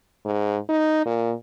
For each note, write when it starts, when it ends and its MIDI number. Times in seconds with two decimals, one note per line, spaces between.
0.25 0.57 44
0.69 1.04 63
1.06 1.33 46